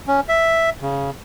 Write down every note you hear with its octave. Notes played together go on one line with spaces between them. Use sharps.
C#4
E5
C#3